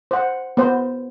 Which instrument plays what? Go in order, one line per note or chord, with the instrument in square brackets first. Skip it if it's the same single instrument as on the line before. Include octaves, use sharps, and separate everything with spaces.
[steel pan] C5 F#5
B3 C5